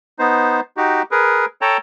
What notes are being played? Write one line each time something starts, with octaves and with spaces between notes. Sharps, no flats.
B3 D#4 C5
D#4 F#4 G4
G#4 A#4 B4
A4 C#5 G5 A5 A#5